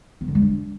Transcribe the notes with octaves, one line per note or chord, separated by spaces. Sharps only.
B3
D3
G3
D4